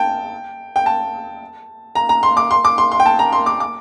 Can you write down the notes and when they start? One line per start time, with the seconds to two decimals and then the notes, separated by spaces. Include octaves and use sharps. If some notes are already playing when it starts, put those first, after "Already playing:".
Already playing: G5 A5
0.76 G5
0.86 A5
1.95 A#5
2.09 A#5
2.23 C6
2.37 D6
2.51 C6
2.65 D6
2.78 C6
2.92 C6
3.00 G5
3.06 A5
3.19 A#5
3.33 C6
3.46 D6
3.60 D6